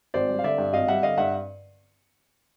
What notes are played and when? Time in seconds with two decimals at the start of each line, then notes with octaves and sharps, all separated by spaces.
0.14 G#1 C5 D5
0.29 G3
0.39 F5
0.44 D3 D5 E5
0.58 G2
0.73 G#1 D#5 F5
0.88 G3 E5 F#5
1.03 D3 D#5 F5
1.18 G2 E5 F#5